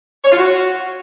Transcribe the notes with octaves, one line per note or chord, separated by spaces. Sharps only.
C#5
F4
F#4